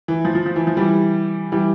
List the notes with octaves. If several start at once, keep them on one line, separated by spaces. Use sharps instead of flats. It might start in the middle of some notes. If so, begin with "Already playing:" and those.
E3
F3
F3
F3
E3
F3
E3 G3
E3 G3